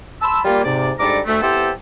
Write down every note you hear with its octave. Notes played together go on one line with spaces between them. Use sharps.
A5 B5 C6 E6
G3 A#3 F4
G#2 C3 D5
G#2 G3 D4 A4 A#5 D6
D2 A3
B3 C4 E4 G4 A4 C5